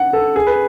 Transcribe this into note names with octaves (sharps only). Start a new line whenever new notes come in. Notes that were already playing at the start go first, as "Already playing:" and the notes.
Already playing: F#5
A4
G#4
B4